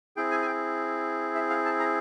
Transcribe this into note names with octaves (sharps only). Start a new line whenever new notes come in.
C4 E4 G#4 G5
G#5
G#5
G5
E5
F5
A5
A#5